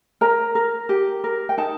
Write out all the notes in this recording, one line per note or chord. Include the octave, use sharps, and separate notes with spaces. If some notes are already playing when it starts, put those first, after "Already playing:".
A#4 A#5
A#4
G4
A#4
G5
D#4 A5